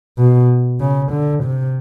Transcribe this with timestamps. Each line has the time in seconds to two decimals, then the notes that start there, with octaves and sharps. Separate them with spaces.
0.18 B2
0.80 C#3
1.12 D3
1.44 C3